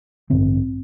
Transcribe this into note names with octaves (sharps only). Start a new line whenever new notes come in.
A1 G2 D3 C4